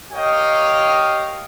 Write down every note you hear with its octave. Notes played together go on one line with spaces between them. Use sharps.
G4 A#4 C#5 D#5 F5 G5